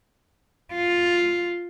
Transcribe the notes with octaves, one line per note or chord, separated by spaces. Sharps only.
F4